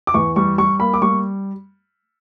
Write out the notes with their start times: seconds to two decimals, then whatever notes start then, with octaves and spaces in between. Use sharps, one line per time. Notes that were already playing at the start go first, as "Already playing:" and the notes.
0.07 D6
0.14 E2 C#6
0.36 G3 C#6
0.58 G3 C#6
0.80 A#3 B5
0.94 D6
1.02 G3 C#6